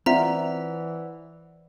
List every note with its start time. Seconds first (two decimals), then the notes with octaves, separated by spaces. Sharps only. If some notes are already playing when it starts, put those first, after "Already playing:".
0.06 E3 C4 F4 C5 D5 E5 F#5 A#5